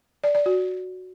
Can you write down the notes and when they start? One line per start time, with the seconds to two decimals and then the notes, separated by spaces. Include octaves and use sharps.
0.24 D5
0.35 D5
0.46 F#4